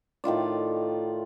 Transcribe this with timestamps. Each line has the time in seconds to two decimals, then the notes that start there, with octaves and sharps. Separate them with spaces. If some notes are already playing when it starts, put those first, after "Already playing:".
0.24 A2 D#3 F4 D5